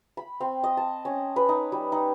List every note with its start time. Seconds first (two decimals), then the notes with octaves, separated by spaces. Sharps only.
0.17 B5
0.40 C4
0.64 D#5
0.77 A5
1.05 C#4
1.36 B4
1.49 D#4
1.72 G3
1.92 D#4